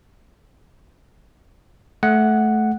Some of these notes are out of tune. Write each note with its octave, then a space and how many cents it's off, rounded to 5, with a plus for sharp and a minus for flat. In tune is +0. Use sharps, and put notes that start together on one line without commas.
A3 -20 F#5 +0